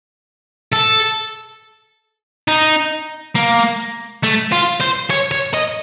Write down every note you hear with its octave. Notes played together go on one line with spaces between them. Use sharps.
A4
D#4
A#3
A3
F4
C5
C#5
C#5
D#5